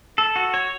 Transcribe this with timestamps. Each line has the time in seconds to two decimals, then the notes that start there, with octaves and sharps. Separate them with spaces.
0.18 A4
0.36 F#4
0.54 C#5